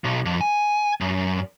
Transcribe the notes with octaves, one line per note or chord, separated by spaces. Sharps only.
B1
F2
G#5
F#2